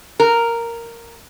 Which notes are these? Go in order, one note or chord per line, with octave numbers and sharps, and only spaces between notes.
A#4